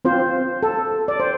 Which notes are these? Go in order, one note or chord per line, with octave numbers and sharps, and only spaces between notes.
C4 F4 C5
A4
D5
C5